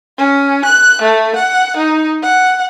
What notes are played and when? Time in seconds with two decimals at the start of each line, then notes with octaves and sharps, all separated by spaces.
0.18 C#4
0.65 F#6
1.01 A3
1.36 F#5
1.77 D#4
2.23 F#5